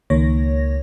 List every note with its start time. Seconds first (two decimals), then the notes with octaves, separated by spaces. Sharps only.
0.10 C#2 D#3 A#3 C#5 A#6